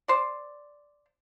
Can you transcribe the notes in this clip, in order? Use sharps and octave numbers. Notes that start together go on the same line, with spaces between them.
C5 D5